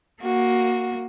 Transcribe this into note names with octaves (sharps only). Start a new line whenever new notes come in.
A#3 F#4